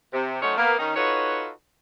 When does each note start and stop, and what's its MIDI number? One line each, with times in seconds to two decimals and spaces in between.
0.13 0.38 48
0.42 0.53 54
0.42 0.53 57
0.42 0.53 61
0.42 0.53 63
0.42 0.53 72
0.42 0.53 73
0.57 0.78 58
0.57 0.78 59
0.78 0.93 51
0.78 0.93 61
0.78 0.93 63
0.96 1.49 63
0.96 1.49 65
0.96 1.49 66
0.96 1.49 69
0.96 1.49 71
0.96 1.49 73